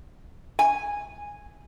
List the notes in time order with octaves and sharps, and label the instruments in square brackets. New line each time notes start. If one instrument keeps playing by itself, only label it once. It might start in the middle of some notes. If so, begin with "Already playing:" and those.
[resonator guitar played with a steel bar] G#5